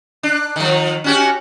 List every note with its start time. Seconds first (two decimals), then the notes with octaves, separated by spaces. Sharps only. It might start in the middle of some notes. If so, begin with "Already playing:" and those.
0.23 D4
0.56 D#3 F3
1.04 C#4 F#4 G4